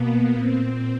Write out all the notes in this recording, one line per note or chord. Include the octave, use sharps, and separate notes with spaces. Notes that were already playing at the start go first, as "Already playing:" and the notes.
Already playing: B2 A#3 B3
A#2 C4